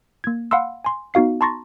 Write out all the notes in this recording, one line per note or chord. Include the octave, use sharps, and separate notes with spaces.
A#3 G#6
F5 F#5 B5 C6 E6
G#5 C6
B3 D#4 F#4 F5 C7
A5 A#5 C6 C#6 A6 A#6